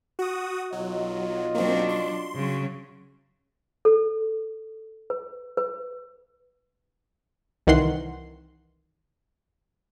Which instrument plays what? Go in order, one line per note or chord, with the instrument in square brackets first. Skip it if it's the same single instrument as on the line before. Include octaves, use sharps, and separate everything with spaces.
[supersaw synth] F#4 D#6
[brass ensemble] B1 F4 D#5 [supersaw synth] F#3
[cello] F#3 D4 [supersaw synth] A#3 C4
[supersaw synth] C6
[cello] C#3 F#3
[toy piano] A4
B4
B4
[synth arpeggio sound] C2 D#3 E3 F#5 C6 C7